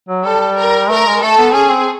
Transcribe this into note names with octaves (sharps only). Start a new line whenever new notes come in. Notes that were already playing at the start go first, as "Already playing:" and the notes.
F#3
G3 A4
A#4
A3 A#4
G#3
A3 A4
B3
C#4 G#4
C4